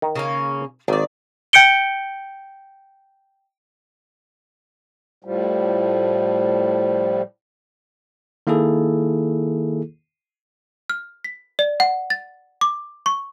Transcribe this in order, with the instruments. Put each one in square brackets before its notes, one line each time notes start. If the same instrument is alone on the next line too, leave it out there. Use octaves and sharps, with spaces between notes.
[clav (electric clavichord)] D#3
[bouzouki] C#3 A#3 C#4
[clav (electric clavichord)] G#1 [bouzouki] D#3 D5
[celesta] G5 G6 C#7 D7 G7
[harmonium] A2 F3 G3
[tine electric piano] D#3 A#3 E4 G#4 A4
[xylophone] F6
B6
D5
F#5
A6
D6
C#6